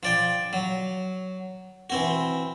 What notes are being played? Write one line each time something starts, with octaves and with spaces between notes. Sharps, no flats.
F3 D5 G5
F#3
E3 C4 F#4